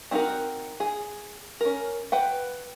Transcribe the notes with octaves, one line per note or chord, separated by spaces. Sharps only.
C4 D4 D#4 F#4 A#4
G#4
C#4 A#4
B4 F#5 G5